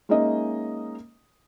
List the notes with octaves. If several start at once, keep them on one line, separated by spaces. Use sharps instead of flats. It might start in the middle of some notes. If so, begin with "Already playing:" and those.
G#3 A#3 C#4 D#4 D#5 E5